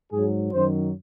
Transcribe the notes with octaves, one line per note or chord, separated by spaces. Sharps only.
G#2 F#3 G#4
F#2 D#3 F#3 C5